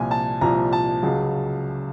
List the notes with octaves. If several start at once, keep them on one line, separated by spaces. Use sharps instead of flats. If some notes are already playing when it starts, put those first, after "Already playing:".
Already playing: C2 A#2 F3 G#5
A5
C2 A#2 F3 A#5
A5
C#2 C#3 F#3